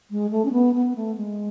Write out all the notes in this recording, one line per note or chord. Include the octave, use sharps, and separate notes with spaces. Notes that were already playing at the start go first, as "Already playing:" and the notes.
G#3
A3
C#4
B3
B3
A3
G#3